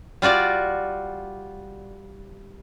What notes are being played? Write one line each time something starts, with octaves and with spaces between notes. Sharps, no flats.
G3 F4 F#4 D5